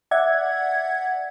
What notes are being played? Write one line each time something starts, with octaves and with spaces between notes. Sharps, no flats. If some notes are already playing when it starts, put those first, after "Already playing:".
D5 E5 F#5 G#6